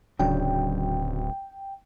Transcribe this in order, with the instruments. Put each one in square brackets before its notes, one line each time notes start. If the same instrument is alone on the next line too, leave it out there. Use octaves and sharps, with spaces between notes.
[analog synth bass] D1 [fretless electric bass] C#3 F#3 D4 [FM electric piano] G5